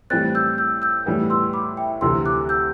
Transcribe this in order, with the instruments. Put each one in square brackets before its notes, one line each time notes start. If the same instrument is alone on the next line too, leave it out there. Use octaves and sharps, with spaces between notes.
[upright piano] A2 E3 G3 C4 [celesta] F#6 A6
[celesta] E6 G6
E6 G6
E6 G6
[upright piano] A2 E3 G3 B3
[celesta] C6 E6
B5 D6
E5 G5
[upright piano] D2 C3 E3 [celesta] C6 E6
[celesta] D6 F#6
E6 G6